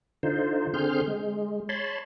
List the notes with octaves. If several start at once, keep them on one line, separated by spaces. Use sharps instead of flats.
D3 D#4 F4 C5
D3 C4 G#4 C6 F6 G6
G#3
C#5 A5 B5 C6